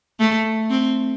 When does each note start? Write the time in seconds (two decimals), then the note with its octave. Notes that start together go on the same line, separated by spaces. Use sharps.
0.20 A3
0.70 C4